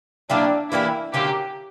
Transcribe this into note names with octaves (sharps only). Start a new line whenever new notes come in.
F#3 A#3 D4 E4 G4
E3 A#3 D4 E4 G4
D3 F#3 A#3 C#4 G4